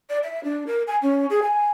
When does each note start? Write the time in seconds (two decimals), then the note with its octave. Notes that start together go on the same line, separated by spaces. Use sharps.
0.10 D5
0.23 E5
0.44 D4
0.67 A#4
0.87 G#5
1.02 C#4
1.30 G#4
1.42 G#5